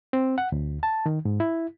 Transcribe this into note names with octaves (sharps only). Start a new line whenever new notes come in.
C4
F#5
D2
A5
D#3
G#2
E4